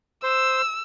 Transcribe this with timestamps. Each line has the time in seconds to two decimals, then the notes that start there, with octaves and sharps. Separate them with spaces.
0.23 C5 E6